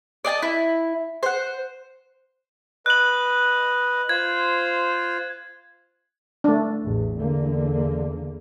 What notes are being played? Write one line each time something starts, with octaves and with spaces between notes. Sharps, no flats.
D5 D#5 G#5 A5
E4
C5 F#5
B4 D#5 F#6 F#7
F4 C5 G#6
A3 D4
A1 E2
E2 D3 A#3